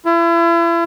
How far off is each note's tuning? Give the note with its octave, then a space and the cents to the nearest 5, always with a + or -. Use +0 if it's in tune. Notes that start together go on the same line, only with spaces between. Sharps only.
E4 +40